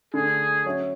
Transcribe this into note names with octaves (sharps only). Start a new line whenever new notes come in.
D3 A3 D4 G#4
F#3 C#4 F#4 C#5 E5